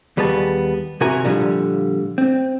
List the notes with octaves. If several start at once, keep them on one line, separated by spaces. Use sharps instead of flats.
D#2 G3 B3 G#4 A5
C3 E4 F#4 A#4 G#5 A#5
A#2 D3 F3 G3
C4